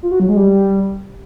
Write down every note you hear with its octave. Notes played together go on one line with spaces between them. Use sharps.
F4
F#4
F#3
G#3
G3